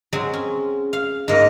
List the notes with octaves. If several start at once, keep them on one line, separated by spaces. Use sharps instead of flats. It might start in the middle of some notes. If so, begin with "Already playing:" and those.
F#3 G#3 C4
C#4
F5
G#2 A#3 D#5